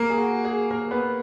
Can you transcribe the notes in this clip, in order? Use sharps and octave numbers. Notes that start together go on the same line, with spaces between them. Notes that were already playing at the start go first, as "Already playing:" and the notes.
Already playing: A#3 A#4
G#4
F#4
G#4
A#3 A#4
B3 B4